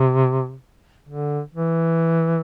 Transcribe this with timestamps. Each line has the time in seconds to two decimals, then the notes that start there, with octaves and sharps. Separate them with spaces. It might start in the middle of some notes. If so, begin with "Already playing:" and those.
Already playing: C3
1.09 D3
1.55 E3